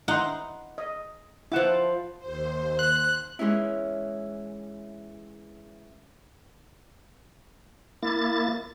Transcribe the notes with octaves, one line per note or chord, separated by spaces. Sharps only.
D#4 E4 F#5 C6
D#5
F3 E4 F#5 A5 D6
D#2 C5
F#6
E3 G#3 C#4 E4
A#3 E4 A6